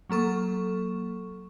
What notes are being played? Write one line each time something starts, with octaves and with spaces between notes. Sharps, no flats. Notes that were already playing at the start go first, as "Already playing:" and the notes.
F#3 A#3 A4 C#6